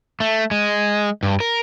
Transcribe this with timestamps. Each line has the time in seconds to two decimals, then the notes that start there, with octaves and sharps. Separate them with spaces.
0.20 A3
0.51 G#3
1.23 G2
1.40 A#4